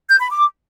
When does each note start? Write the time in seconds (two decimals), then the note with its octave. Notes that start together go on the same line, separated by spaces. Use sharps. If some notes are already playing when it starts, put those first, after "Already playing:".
0.09 G6
0.20 B5
0.30 D6